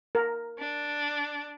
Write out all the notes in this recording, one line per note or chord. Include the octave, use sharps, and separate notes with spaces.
A#4
D4